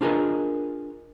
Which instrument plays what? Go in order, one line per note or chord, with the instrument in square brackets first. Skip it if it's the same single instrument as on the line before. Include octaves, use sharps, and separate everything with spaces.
[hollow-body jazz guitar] D4 F4 G#4 A#4 B4 D#5